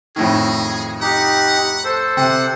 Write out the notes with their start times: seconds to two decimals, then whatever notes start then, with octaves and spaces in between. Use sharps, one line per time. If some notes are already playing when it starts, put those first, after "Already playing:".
0.16 F2 A2 D#3 G#4
1.01 D#4 G4 F#5
1.84 A4 C5
2.17 C3 F#5